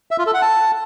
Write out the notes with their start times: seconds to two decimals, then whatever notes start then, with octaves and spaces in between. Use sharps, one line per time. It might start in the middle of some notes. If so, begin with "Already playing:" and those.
0.11 E5
0.19 F4
0.26 A4
0.34 F#5
0.42 A5